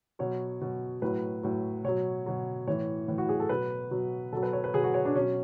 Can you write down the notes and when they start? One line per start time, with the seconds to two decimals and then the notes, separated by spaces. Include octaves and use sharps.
0.19 B2 F#3 C#5
0.61 B2 F#3
1.02 A2 F#3 B4
1.43 A2 F#3
1.84 B2 F#3 C#5
2.26 B2 F#3
2.67 A2 E3 C#5
3.08 A2 E3
3.18 F#4
3.29 G#4
3.40 A4
3.49 B2 F#3 B4
3.91 B2 F#3
4.32 B2 F#3 A4
4.43 B4
4.53 C#5
4.64 B4
4.73 B2 F#3 G#4
4.84 F#4
4.94 C#5
5.05 D4
5.15 B2 F#3 C#4